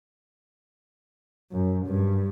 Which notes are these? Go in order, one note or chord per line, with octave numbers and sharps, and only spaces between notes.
F#2
G2